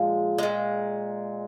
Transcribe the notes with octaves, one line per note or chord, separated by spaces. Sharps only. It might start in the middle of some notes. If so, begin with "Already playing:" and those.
Already playing: A#2 F3 G#3
A#2 G#3